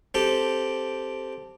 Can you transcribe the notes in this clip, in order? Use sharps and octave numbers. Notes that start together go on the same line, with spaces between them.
C4 G4 A4